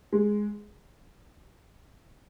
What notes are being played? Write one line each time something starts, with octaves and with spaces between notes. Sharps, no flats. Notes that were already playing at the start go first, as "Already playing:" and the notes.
G#3